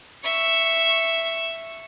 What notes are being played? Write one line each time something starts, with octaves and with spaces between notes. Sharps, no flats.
E5 C#6